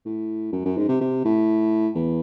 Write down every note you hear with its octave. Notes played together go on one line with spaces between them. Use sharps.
A2
F#2
F#2
G#2
C3
C3
A2
E2